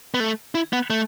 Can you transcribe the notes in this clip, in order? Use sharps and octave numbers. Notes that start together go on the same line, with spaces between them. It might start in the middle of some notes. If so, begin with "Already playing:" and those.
B3
A3
E4
B3
A3